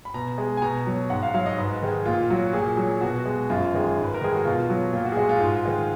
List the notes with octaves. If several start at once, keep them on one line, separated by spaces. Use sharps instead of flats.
B5
B2 A#5
G#3
G#5
B2 A#5
F#3
G#2 F#5
F5
F#3 F5
D#5
G#2 B4
D#3 G#3
A#2 F4
F#3 F#4
A#2 G#4
F#3
B2 F#4
G#3
F#2 F4
D#3 G#3
G#2
B4
A#4
D#3 G#3 G#4
F#4
B2 F4
F#3
A#2 F4
F#4
G#4
G#3 F#4
F4
G#2
D#3 G#3